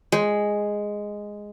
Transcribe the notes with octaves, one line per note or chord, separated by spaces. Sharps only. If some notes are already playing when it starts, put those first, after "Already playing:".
G#3